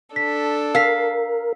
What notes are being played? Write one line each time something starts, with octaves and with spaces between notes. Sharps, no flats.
D4 A4 B6
A#4 F5 E6 B6 C7